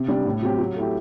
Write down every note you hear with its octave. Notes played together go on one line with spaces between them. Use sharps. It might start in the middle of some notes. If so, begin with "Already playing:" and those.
Already playing: C3
G3 D4
A2
F#3 C4 G4
F#3
A3 E4 G4